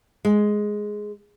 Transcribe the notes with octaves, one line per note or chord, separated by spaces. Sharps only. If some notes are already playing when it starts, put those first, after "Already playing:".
G#3